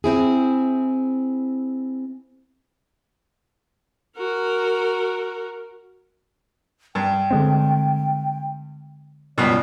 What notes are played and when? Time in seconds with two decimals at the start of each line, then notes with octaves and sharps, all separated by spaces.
0.04 C4 E4 G#4
4.17 F#4 A#4
6.95 G2 G5
7.31 D3 G#3 C4
9.38 C#2 G2 B2 D5